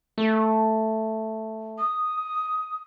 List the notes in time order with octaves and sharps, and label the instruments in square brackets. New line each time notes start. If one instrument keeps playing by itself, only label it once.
[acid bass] A3
[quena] D#6